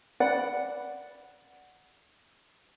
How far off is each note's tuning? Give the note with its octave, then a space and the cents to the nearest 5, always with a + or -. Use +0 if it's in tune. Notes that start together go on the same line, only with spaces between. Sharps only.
D5 -5 F#5 +0 B5 +0